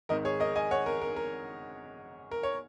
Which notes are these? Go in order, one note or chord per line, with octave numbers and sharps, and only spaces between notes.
G#1 G#2 D#3 A#4 D#5
G#4 C#5
A#4 D#5
D#5 G#5
C#5 F#5
A#4
A#4
A#4
A#4
C#5